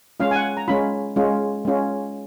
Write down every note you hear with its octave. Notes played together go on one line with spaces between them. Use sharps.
G#3 C#4 F4 F5
G#5
F#5
A#5
G#3 C#4 F4 B5
G#3 C#4 F4
G#3 C#4 F4